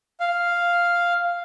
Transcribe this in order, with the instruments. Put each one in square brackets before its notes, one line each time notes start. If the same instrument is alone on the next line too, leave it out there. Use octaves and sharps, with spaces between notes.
[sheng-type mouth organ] F5